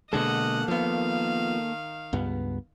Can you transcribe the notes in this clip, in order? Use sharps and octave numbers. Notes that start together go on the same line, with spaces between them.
B2 D3 G#3 A#3 A4 D#5 F#5
D#3 F3 B3 F5
C#2 G2 B3